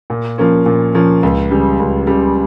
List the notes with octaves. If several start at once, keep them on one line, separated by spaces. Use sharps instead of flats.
A#2
F3 A#3 C#4
A#2
F3 A#3 C#4
C#2
C#3 G3
C#2
C#3 G3